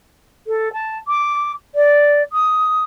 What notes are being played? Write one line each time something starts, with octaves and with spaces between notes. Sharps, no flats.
A4
A5
D6
D5
D#6